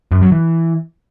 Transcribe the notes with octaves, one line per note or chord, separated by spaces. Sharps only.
F#2
F#3
E3